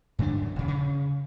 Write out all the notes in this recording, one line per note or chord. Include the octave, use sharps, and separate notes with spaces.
G2 D3 C4 D4
F#2
D#1 C#3
C#3